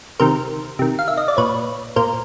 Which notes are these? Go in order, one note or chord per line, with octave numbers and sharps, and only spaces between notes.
C3 D#3 A#4 C5
C3 D#3
F5
E5
D#5
D5
A#2 B4 C#5
A#2 A#4 C5